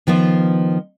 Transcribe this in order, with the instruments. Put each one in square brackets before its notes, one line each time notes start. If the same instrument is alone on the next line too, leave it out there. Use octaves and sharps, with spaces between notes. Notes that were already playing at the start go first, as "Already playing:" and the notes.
[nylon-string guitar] D#3 F3 B3 F4